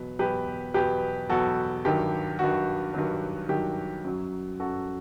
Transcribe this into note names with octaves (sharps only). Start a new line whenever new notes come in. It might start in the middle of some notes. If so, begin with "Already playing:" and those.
Already playing: E2 B2 F#3 B4
E2 B2 F#3 G4 B4
E2 B2 F#3 G4 B4
E2 B2 F#3 F#4 A4
G2 D#3 F#3 G4
G2 D#3 F#3 F#4
G2 D#3 F#3
G2 D#3 F#3 G4
F#2 F#3
F#2 F#3 F#4 A4